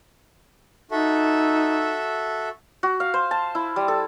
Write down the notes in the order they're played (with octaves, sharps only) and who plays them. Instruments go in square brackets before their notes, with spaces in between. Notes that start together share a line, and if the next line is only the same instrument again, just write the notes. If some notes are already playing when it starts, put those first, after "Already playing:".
[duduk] D#4 [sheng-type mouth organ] F#4 A4 E5
[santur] F#4
F5
C5
A5
E4
G3
A4